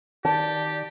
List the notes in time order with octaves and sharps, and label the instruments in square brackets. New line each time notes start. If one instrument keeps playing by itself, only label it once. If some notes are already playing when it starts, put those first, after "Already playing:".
[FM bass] D#3 [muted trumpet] G4 [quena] D5 [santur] A5